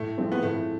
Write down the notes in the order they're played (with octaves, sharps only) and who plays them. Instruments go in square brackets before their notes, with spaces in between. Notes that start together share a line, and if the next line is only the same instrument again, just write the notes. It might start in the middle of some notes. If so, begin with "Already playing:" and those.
Already playing: [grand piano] A2 [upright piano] A3
[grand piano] F3 G#3 C4
[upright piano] B3
[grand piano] A2 [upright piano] A3